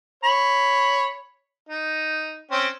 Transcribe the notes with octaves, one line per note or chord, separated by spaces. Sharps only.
C#5 B5
D#4
C4 C#4 G5